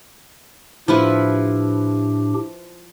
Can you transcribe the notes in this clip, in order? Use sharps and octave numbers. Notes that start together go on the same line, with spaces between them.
A2 F3 D4 E4 G4 B4